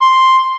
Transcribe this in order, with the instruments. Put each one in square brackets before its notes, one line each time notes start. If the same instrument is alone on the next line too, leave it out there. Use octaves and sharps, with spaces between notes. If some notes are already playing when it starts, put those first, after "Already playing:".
[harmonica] C6